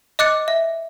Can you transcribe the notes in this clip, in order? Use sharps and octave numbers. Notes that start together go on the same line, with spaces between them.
D#5 D6 F#6 A6 C#7
E5